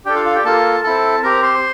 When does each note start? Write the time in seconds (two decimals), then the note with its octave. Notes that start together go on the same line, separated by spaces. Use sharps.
0.05 D4 G4 A4 G5
0.15 F4 F5
0.25 F4 F5
0.35 G4 G5
0.44 A#3 F4 A4 A5
0.84 C4 E4 A4 A5
1.23 C4 G4 A#4 A#5
1.43 C5 C6